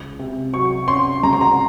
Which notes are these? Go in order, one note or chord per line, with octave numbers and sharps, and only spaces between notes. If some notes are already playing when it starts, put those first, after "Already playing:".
Already playing: C#2
C3
F#3 C#6
C#4 C6
C#2 A#5
C6
A#5